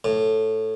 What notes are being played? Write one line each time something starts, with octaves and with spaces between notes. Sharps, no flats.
A2